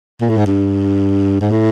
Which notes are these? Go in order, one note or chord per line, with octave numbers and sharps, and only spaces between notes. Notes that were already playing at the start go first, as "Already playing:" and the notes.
A#2
A2
G#2
G2
G#2
A2